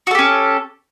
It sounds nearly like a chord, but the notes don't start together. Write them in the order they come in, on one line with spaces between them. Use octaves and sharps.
F#4 A4 G4 C#4